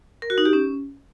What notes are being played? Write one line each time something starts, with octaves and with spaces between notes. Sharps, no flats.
A#4
F#4
D#4
G4
C#4